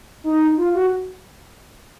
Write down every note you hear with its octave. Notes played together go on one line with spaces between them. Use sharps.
D#4
F4
F#4